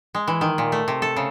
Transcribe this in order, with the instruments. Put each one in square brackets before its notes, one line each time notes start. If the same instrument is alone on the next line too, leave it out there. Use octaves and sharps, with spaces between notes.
[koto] G#3
E3
D#3
A#2
A3
C3
A4
C#3